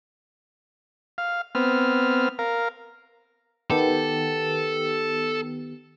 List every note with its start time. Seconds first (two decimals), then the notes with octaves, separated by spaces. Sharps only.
1.18 F5
1.55 B3 C4 F6
2.39 A#4 F5
3.70 D#3 B3 G4 A4